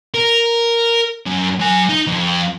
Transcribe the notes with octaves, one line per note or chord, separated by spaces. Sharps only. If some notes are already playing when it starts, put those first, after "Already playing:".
A#4
F#2
F#3 G#5
D#4
F2